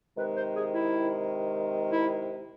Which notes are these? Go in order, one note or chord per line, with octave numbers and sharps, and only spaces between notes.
C3 D#3 G#3 B4
C5
G#4
E4
E4